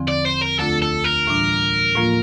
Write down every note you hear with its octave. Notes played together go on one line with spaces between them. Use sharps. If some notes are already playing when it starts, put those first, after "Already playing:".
Already playing: E2 D3 F3 C4
D5
C5
A#4
D2 D3 A3 D4 F4 A4
A4
A#4
A2 E3 G3 D4
A2 F3 A#3 F4